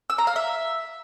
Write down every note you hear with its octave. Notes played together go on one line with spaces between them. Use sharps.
E6
A#5
F5
E5